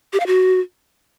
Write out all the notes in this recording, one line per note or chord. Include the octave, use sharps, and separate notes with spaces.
G4
F5
F#4